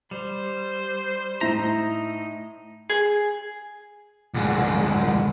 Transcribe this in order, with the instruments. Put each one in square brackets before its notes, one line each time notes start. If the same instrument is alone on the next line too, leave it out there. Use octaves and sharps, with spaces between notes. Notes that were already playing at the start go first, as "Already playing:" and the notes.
[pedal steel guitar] G3 [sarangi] C5
[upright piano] A2 E4 [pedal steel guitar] D#4 A#5
[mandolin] G#4
[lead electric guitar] D2 G#2